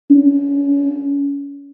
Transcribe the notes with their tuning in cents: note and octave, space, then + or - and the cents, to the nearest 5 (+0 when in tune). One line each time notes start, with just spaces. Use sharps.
C#4 +30